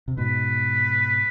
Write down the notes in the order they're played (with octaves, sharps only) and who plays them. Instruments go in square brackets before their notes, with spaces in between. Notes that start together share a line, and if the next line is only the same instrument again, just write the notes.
[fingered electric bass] C3
[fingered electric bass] G#2 B2 [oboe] B4